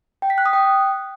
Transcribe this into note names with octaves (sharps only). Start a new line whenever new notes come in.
G5
B6
F#6
D#6
G5